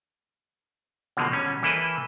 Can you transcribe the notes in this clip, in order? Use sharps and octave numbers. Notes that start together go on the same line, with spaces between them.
B2 D3 F3 F#3 G#3 A#3
G3 C#4
E3 A#3 E4 A4 B4 D#5